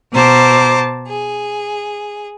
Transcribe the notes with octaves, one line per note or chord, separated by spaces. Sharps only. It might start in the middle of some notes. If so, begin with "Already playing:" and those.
B2 C5 A5 A#5 D6
G#4